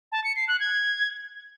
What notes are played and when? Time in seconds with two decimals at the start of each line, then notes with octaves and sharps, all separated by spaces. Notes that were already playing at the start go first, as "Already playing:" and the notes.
0.12 A5
0.24 C#7
0.36 C7
0.48 F#6
0.60 G#6